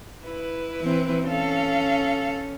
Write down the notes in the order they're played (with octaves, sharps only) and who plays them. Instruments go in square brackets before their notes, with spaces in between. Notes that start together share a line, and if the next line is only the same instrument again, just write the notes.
[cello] E4 B4
[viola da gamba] E3 C4
[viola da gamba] C#4 [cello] A4 F5